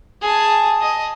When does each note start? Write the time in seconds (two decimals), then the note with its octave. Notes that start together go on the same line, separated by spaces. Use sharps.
0.22 G#4 A5
0.82 D#5